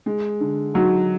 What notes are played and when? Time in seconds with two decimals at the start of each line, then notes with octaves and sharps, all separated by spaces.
0.06 G#3
0.40 D3
0.74 F#3 D#4